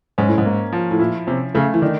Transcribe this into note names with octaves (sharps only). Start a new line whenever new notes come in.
G#2 C#4
A2
G#2
A#3
F3
A2
A#2 E4
C3 C#4
C#3 A3
E3
D#3 D4